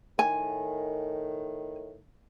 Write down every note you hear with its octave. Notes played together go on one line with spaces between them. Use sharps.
A2 D#3 G#5